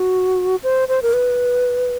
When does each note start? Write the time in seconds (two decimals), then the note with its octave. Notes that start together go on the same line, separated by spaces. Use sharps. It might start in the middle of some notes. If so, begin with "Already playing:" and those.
Already playing: F#4
0.63 C5
0.88 C5
1.02 A#4
1.13 B4